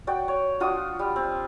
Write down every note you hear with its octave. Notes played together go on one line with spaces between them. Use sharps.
F#4 D5 G5
C#5
D4 F4 F#4 D#6
G3
C4